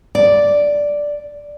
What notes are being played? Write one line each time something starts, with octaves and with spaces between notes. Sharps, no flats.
D5